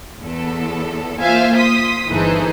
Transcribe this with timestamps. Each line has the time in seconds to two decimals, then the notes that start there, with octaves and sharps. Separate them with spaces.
0.21 E2 A4
1.19 A#3 F4 C5 E5 F5 G#5
1.57 C6 D#6 B6
2.09 G1 E3 D#4 G#4 A4 C5